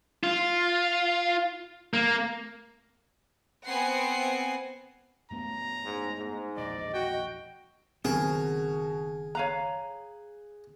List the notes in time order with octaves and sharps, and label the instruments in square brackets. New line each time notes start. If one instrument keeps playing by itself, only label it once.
[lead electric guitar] F4
A#3
[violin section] B3 C4 F#5 G#5 C7
[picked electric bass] F#2 A3 B3 [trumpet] A#5
[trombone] G#2
G#2
[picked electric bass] E1 A#1 [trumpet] D5 [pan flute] D#5
[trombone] F#4 [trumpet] G5
[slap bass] F#1 D#3 C4 [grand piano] B2 F#4 A#4 [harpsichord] G#4
[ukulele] C#5 F5 A#5 [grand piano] F#6 D#7